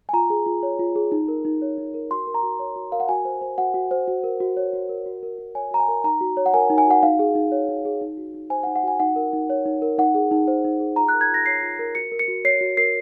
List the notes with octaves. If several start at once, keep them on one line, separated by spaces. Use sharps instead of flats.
G#5
F4 A#5
G#4
F4
C#5
F4
G#4
D#4
A#4
D#4
C#5
D#4
A#4
F#4 C6
A#4
A#5
F#4
C#5
F#4
A#4 F5
F#5
F#4 G#5
C5
C5
F#4 F#5
F#4
C5
F#4
A#4
F#4
C#5
F#4
A#4
F#4
A#4
F#4
C#5 G#5
F#4 A#5
G#5
A#4
D#4 A#5
F#4
C#5
F#5
A#4 G#5
D#4
G#5
F#4 F#5
D#4 F5
G#4
D#4
C#5
D#4
G#4
D#4
F#4
D#4
C5 G#5
F#5
D#4
F#5
F#4 G#5
D#4 F#5
A#4
D#4
C#5
D#4
A#4
D#4 F#5
G#4
D#4
C5
D#4
G#4
F4 A#5
A#4 F#6
G#6
F4 A#6
C#5 C7
F4
A#4
F#4 C#7
A#4
C#7
F#4
C#5 C7
F#4
A#4 C7